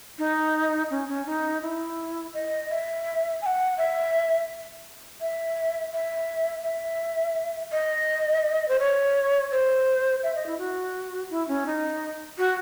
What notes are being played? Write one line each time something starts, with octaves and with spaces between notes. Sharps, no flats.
D#4
C#4
C#4
D#4
E4
D#5
E5
G#5
F#5
E5
E5
E5
E5
D#5
C5
C#5
C5
E5
D#5
E4
F#4
E4
C#4
D#4
F#4